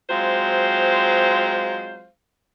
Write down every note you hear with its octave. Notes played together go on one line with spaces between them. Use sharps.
F#3 G#3 C4 F4 C5 F5